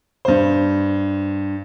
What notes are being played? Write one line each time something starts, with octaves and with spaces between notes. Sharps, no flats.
G2 C5